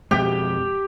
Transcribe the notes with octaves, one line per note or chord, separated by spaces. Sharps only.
F2 B2 G#3 G4